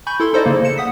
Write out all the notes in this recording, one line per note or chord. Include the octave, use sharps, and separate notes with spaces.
G#5 B5 C#6 G6
E4 A4 C6
D#4 A4 C5 D5 D#5
C#3 A#3
C#7 E7
F#5 D#6 B6